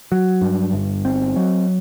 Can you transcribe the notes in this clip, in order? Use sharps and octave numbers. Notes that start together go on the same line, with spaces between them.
F#3
G2
G1
C4
F#3